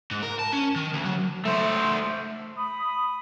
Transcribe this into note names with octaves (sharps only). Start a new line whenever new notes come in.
G#2
A#4
A5
C#4
D#3
D2
F#3
A3 C5
B5 D#6